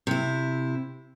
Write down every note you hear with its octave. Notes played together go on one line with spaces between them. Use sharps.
C3 E4